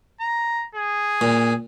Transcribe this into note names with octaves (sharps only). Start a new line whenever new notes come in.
A#5
G#4
A#2